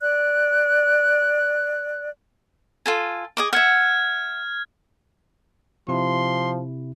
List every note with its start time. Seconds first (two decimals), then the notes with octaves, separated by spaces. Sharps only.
0.01 D5 F#6
2.86 F4 A4 G#5
3.37 G#4 D#5 D6
3.53 E5 F#5 F6 G#6
5.88 C3 F3 E4 C6